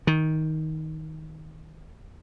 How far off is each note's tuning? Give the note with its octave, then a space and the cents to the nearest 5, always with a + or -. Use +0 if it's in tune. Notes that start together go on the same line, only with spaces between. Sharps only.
D#3 +10